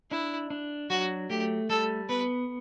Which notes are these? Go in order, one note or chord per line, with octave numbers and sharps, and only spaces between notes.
D4 E4
D4
F#3 F#4
A3 G4
G3 A4
B3 B4